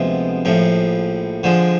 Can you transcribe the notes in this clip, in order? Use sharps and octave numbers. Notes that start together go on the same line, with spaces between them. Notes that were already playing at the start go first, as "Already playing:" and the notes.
Already playing: D2 C3 F3 G#3 B3
A#1 A2 F3
D3 F3 G#3